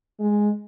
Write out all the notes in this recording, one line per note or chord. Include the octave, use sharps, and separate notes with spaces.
G#3